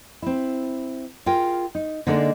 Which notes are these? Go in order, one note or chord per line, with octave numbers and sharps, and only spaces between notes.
C4 E4
F4 G#4 A#4 G5
D#4
D3 G#3 A#3 D#4 A4 D5